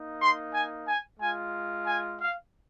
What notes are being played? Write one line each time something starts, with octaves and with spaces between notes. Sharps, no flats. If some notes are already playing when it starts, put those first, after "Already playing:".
Already playing: A#3 D#4
C6
G#5
G#5
G#3 F4 G#5
G#5
F5